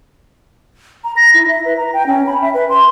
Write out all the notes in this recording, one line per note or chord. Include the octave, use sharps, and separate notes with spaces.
A#5
A#6
E4
E5
B4
A#5
G5
C#4
B5
E5
B4
C6